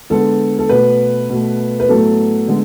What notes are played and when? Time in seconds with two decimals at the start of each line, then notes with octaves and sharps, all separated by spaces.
0.10 D3 G#3 B3 A4
0.59 A4
0.69 B2 A3 B4
1.29 B2 A3
1.80 B4
1.89 A2 F#3 B3 A4
2.48 D3 G#3 B3